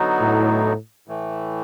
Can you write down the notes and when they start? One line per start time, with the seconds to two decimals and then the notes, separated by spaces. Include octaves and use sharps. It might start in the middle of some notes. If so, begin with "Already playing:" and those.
Already playing: D3 F#3 B3 D#4 F#4
0.21 A2
1.08 A2 E3 A3